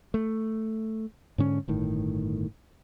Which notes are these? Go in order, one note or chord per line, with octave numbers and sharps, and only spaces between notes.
A3
G#2 D3 C#4
G1 A2 D#3